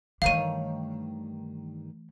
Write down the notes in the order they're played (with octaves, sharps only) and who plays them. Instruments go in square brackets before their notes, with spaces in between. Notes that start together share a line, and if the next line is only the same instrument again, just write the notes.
[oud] G2 D#3 C#5 [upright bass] E3 A3 [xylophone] F5 D#7